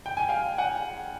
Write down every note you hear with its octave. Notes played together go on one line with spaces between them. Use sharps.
G5
G#5
F5 G5
F#5 G#5